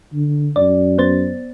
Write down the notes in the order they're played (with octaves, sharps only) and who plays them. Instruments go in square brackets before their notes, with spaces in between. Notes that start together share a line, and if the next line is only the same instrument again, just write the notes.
[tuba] D3
[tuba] F#2 [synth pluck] D5
[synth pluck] B3 C5 A6